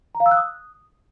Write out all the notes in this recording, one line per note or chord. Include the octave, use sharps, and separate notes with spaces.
A#5
F5
E6
F#6
D#6